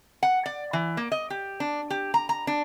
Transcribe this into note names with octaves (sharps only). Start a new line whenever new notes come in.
F#5
D5
E3
A#3
D#5
G4
D4
G4
A#5
A#5
D4